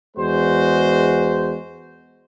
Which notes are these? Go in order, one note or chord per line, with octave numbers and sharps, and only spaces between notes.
E2 G#3 F#4 C5